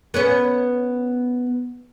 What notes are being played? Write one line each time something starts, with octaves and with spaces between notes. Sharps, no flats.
B3 C#4 B4